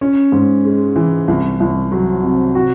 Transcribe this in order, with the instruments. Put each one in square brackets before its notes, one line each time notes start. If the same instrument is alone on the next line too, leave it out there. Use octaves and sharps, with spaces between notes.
[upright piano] C#4
G#2
G#3
E3
C2
C2
F#3
C3
F#4